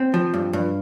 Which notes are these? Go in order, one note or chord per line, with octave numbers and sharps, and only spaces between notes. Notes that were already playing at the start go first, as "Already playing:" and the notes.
Already playing: C4
F3
G2
G2